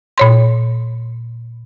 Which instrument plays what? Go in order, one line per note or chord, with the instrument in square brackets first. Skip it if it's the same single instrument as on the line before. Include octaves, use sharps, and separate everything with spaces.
[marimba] A#2 C#5 C6